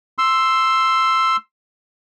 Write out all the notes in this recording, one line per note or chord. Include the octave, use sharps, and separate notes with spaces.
C6 E6